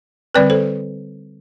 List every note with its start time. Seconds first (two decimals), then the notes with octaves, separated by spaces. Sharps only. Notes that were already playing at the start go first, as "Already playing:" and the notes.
0.35 D3 G3 C4 B4 D5
0.50 A4 C5